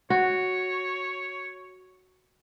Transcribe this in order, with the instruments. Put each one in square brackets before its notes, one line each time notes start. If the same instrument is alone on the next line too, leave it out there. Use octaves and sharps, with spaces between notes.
[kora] F#4 [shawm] C#5